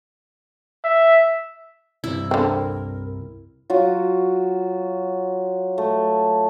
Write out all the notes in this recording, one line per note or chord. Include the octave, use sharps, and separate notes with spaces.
E5
C2 G2 C3 E4
D3 C4 A#4
F#3 F4 F#4
A3